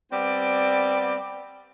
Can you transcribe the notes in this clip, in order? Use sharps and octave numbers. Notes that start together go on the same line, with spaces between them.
G3 B3 C4 D5